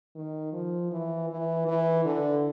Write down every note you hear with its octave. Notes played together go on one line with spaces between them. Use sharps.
D#3
F3
E3
E3
E3
D3